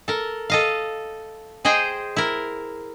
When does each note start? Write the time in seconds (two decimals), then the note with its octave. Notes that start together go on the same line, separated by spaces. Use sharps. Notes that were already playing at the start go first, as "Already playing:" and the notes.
0.08 A4 A#4
0.50 A4 D#5 F5
1.65 G#4 C5 D#5 G5 G#5
2.16 E4 A#4